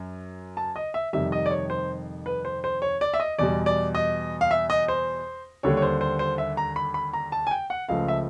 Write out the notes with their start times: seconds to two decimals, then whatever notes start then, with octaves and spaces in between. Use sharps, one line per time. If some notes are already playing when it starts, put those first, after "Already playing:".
Already playing: F#2
0.57 A5
0.76 D#5
0.94 E5
1.13 F2 C3 D#3 G3 E5
1.32 D#5
1.46 D5
1.51 C#5
1.70 C5
2.26 B4
2.45 C5
2.64 C5
2.82 C#5
3.01 D5
3.14 E5
3.20 D#5
3.38 E2 B2 G3 D5
3.66 D5
3.95 D#5
4.41 F5
4.51 E5
4.70 D#5
4.88 C5
5.63 D#2 D3 G3 C#5
5.77 C#5
5.82 C5
6.01 C5
6.19 C5
6.38 E5
6.57 A#5
6.76 B5
6.94 B5
7.13 A#5
7.32 A5
7.47 G#5
7.51 G5
7.70 F#5
7.89 C#2 C#3 F3 A3 F5
8.08 E5